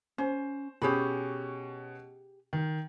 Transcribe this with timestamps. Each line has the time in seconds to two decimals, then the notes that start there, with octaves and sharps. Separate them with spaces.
0.18 C#4 C5
0.82 B2 C#4 G4 G#4 B5
2.53 D#3